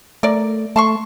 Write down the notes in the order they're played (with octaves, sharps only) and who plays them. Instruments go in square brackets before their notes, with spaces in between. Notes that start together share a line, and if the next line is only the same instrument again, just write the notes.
[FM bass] A3 [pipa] A#4 D5
[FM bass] A3 [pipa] A5 C6 C#6